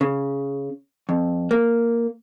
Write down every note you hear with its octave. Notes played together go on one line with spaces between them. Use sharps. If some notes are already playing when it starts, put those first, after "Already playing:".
C#3
F2
A#3